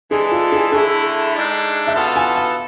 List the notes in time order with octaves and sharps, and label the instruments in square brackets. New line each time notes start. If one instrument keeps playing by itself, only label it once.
[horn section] E3 G#3 D4 A4 [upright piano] G#4
[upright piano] F4
G#4
[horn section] D3 A3 E4 [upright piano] G#4
[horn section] G#2 G#3 D4
[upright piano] E5
[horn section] B2 B3 F4 A4 [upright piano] F5
[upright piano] G#5
F5